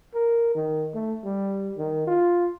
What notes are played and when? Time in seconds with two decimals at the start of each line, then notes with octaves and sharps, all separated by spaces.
0.14 A#4
0.55 D#3
0.94 A3
1.25 G3
1.77 D#3
2.07 F4